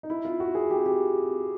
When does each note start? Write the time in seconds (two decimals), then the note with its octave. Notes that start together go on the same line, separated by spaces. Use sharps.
0.03 D#4
0.10 E4
0.25 F4
0.40 F#4
0.55 G#4
0.71 G4
0.86 G4